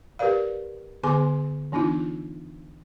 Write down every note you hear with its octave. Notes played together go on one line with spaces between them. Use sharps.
G4 A#4 B4 D5 F5
D3 B3 G#4 G#5 C6 D6
E3 B3 D4 D#4 F4